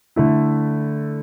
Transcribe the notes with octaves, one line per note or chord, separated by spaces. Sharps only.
D3 A3 E4